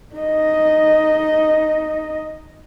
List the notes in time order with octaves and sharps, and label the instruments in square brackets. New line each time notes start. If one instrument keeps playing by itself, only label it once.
[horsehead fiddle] D#4 D#5